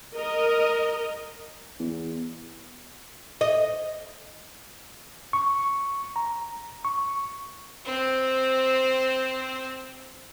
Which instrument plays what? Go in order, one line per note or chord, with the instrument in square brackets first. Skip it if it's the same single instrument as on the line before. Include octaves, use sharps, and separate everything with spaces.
[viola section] A#4 D#5
[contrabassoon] E2
[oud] D#5
[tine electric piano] C#6
A#5
C#6
[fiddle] C4 C5